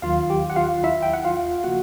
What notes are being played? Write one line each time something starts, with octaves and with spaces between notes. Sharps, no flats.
D#2 D#3 F#3 F4 F5
G4 G5
F#5
F4 F5
E4 E5
G5
F#5
F4 F5
C#3 F3 A#3 F#4 F#5